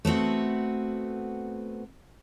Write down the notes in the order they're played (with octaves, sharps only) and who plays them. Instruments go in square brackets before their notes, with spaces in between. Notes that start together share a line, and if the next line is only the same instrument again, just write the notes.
[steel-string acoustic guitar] A3 B3 C4 F#4